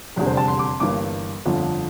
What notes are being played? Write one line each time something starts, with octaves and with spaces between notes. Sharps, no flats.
F1 E2 D3 G3
C5
A5
C6
D6
C6
G1 G2 E3 A#3 D6
G1 F2 D3 F3